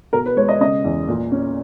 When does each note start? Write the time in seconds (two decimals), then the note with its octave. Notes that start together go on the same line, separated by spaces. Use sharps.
0.13 B2 A#4
0.26 B4
0.36 G#3 C#5
0.49 D#5
0.60 C#3 D#5
0.84 E2
1.08 A#2
1.32 C#4